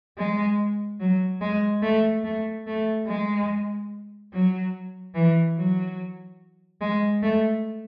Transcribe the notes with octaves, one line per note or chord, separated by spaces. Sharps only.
G#3
F#3
G#3
A3
A3
A3
G#3
F#3
E3
F#3
G#3
A3